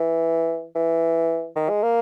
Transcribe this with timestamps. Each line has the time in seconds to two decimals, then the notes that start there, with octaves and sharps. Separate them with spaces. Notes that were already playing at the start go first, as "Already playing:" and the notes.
Already playing: E3
0.76 E3
1.56 D#3
1.69 G#3
1.83 A#3